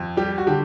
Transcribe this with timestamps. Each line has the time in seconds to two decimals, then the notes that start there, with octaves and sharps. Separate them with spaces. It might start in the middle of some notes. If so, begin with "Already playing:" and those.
Already playing: F2
0.17 G3 G4
0.38 F#4
0.47 D3 G4